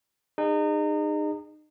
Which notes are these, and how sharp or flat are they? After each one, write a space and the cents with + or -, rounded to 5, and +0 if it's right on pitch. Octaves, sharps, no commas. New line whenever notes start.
D#4 -30 G#4 -30